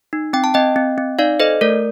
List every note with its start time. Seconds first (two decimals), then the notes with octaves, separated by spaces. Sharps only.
0.13 D#4
0.33 C4 G5
0.44 A5
0.54 C4 D#5 G5
0.76 C4
0.98 C4
1.19 D#4 D5 F5
1.40 A4 C5 D#5
1.61 A3 A#4 D5